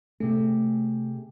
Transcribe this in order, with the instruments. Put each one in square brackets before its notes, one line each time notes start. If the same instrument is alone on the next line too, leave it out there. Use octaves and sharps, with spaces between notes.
[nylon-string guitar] C3 G#4 [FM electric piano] A3